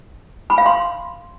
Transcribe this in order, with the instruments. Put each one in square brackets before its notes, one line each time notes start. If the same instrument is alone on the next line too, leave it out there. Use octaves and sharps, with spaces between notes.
[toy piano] B5
F5
C6